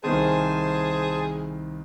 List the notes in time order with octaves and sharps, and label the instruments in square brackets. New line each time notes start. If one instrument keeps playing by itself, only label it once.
[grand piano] C2 D#3 C4 [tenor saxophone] G#4 [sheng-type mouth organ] C5 G#5 A5